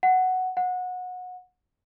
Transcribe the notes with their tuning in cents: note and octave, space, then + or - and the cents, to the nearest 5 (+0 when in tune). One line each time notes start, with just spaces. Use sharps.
F#5 +5
F#5 -25